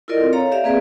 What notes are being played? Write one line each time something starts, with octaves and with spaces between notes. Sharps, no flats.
E4 F4 A4 A#4 D5 D#5
C4
A4 C#5 F5 A#5
G4 D5 E5 F5
A#3 C4 G#4 B4 D5